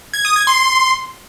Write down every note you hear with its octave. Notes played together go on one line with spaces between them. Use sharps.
G#6
D#6
G#6
C6